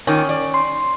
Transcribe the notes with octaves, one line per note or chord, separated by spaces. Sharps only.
A#2 D#3 C#4
D5
C6